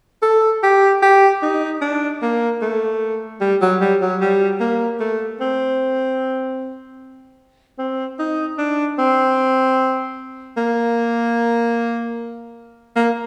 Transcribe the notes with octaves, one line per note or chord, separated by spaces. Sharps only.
A4
G4
G4
D#4
D4
A#3
A3
G3
F#3
G3
F#3
G3
A#3
A3
C4
C4
D#4
D4
C4
A#3
A#3